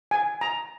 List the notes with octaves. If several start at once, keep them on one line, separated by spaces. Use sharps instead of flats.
G#5
A#5